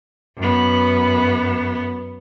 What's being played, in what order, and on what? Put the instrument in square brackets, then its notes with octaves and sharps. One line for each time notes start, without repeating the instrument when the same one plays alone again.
[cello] F#2 B3